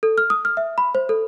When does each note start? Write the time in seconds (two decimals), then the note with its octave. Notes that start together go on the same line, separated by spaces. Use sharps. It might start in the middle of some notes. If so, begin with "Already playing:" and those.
0.03 A4
0.18 F6
0.30 D#6
0.45 F6
0.57 E5
0.78 B5
0.95 C5
1.09 A4